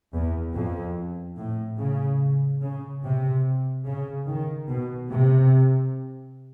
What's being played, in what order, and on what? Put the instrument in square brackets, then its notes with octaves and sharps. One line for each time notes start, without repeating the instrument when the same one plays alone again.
[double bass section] E2
F2
A2
C#3
C#3
C3
C#3
D#3
B2
C3